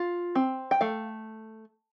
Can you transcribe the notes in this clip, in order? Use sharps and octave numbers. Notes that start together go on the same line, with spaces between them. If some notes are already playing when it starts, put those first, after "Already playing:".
Already playing: F4
C4
G5
A3 F5